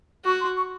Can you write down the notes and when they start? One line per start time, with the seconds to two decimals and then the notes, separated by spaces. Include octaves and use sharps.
0.25 F#4 C#6
0.40 C6
0.56 C#6